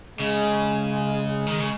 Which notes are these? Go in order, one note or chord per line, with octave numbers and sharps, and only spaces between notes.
C#3 G#3
D#3
C#3